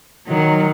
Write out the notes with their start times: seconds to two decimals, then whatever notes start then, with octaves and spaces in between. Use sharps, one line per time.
0.28 D#3 F#3